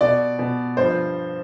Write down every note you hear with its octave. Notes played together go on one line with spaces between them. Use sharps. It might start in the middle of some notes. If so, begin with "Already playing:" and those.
B2 D5
B2
G2 F3 C5